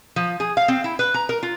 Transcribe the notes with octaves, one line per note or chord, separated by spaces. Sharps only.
F3
G#4
F5
C4
E4
B4
A#5
A#4
F4